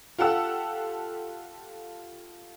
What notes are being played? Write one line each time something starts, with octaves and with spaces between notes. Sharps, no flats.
F4 G4 A4 F#5 A5 E6